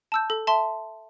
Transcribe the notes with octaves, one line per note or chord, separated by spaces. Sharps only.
A5 E6 G6
A4
E5 A5 C6